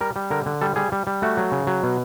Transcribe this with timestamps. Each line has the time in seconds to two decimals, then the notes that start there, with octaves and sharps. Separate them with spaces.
0.01 G3 A#4
0.16 G3
0.30 D3 A#4
0.46 D3
0.61 G3 A4
0.76 G3 G#4
0.92 G3
1.07 G3
1.22 A3 F#4
1.37 F#3
1.52 C#3
1.67 F#3
1.83 B2